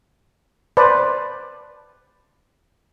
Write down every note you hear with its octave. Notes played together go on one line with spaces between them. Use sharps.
B4 C5 D5 A5